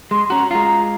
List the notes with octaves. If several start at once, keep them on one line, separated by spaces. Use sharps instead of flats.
G#3 C6
C#4 F#4 A#5
G#3 F4 A#5